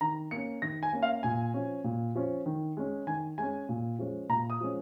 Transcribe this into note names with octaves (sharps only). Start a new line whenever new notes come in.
D#3 A#5
A#3 C#4 C#7
D#3 A#6
G#5
A#3 C#4
F5
A#2 G#5
F3 C#4
A#2
F3 C#4
D#3
G#3 C#4
D#3 G#5
G#3 C#4 G#5
A#2
F3 G#3 C#4
A#2 A#5
D#6
F3 G#3 C#4